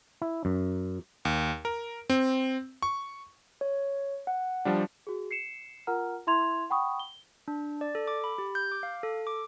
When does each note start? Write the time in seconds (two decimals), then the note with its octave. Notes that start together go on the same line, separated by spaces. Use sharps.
0.22 E4
0.45 F#2
1.25 D#2
1.65 A#4
2.10 C4
2.83 C#6
3.61 C#5
4.27 F#5
4.65 F3 G3 D4
5.07 F#4 G#4
5.31 C7 C#7 E7
5.87 F4 A#4 F#5 A#5 F6
6.27 E4 E5 C6 G#6 F7
6.70 F#5 G5 B5 C#6 D#6
7.00 G7
7.48 D4
7.81 D5
7.95 A4
8.08 D6
8.24 B5
8.38 G4
8.55 G6
8.72 D6
8.83 F5
9.03 A4
9.27 D6